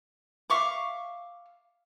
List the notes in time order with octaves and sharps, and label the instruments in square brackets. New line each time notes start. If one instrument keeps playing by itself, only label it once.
[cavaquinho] E5 F5 C#6 D6